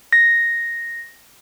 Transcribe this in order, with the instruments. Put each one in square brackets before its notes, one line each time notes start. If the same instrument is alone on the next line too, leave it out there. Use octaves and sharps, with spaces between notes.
[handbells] A#6